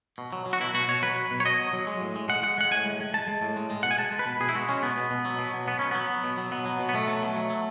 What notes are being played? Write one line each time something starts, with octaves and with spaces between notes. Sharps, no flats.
B2
F#3
F#3
F#4
B2 E4
B2 F#4
B2 C#5
F#3 B4
F#3
B2
C#5
B2 D#5
F#3
F#3
G#3
A2
G#3
G#3 F#5
G#3 F#5
G#3 F#5
A2 G#5
G#3
G#3
G#3 A5
G#3
A2
G#3
G#3
B2 F#5
G#5
G#3 A5
G#3
B4
B2
B2 G#4
E4
G#3 F#4
G#3 C#4
B2 B3
B2
B2
F#3
B2
F#3
B2 B3
F#3 C#4
F#3 B3
F#3
B2
F#3
B2 B3
F#3
B2
B3
B2 A3
F#3
B2
F#3
F#3